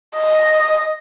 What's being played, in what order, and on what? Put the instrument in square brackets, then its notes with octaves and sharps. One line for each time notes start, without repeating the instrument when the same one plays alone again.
[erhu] D#5